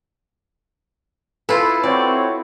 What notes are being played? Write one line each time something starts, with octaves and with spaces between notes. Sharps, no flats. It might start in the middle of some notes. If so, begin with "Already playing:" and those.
E4 F4 A4 B4
C4 E4 F#4 C#5 D5